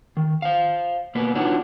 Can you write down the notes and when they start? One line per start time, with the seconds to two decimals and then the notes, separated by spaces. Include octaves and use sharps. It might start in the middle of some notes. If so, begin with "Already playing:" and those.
0.17 D#3
0.42 C5 F5
1.15 B2 A#3 B3 B4
1.35 D4 D#4 F4 F#4 B4 C#5